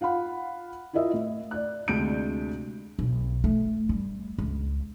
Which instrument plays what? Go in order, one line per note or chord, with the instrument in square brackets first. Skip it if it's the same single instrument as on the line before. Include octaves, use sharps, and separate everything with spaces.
[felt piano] F4 F5 F#5 B5
E4 F4 A#4 D#5 E5
A2
D5 F#6
D2 C3 G#3 D4 G6 D7
[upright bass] B1
A3
G3
C#2